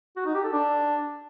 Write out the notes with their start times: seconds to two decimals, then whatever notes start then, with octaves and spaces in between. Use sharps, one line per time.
0.16 F#4
0.26 D#4
0.35 G4
0.44 A4
0.53 D4